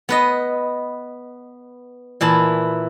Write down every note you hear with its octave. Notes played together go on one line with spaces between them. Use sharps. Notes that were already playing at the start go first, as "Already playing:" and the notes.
B3 B4 D#5
A#2 E3 E4 A5